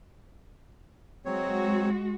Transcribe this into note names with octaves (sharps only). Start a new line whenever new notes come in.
F#3 G#3 C4 F#4 C#5